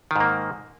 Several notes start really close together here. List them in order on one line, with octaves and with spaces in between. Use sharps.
D#3 G#2 A#3